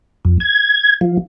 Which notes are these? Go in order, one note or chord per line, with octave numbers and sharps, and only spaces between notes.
F2
G#6
F3